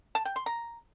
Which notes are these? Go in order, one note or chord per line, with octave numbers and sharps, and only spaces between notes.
A5
G5
C6
A#5